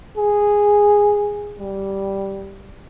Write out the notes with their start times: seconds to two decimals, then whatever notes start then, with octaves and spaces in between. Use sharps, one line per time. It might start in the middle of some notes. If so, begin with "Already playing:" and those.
0.17 G#4
1.60 G3